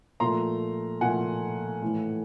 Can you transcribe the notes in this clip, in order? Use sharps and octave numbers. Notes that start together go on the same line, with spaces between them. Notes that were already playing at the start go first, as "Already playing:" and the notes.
A#2 F3 A3 A#5 C6
A#2 F3 A3 F#5 G#5
A2 E3 A3